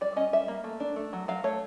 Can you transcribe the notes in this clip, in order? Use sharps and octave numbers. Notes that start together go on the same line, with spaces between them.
G3 D5
C#4 D#5
G3 E5
A#3
A3
D4
A3
F#3
F#3 F5
A3 C#5